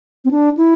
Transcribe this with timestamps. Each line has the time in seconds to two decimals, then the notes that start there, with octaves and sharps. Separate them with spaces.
0.25 C4
0.31 D4
0.57 E4